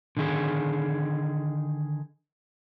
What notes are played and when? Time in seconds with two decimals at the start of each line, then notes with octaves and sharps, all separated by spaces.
0.17 D3 D#3 G#4